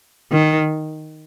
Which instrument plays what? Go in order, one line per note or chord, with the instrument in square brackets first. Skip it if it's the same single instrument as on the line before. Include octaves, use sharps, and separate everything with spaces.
[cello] D#3